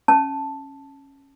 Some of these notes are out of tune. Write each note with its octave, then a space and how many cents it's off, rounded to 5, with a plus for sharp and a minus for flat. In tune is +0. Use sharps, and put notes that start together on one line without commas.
C#4 -15 A5 +0